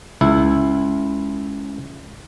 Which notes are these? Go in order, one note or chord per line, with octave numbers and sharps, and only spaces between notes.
C#2 E4